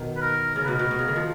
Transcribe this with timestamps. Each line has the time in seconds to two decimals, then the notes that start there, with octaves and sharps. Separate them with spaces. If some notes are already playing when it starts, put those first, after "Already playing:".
Already playing: B2 D#3
0.16 B4
0.21 A#4
0.56 C#3 A#4
0.65 B2 B4
0.75 B2 A#4
0.91 B2
0.99 C#3
1.08 D#3
1.16 F3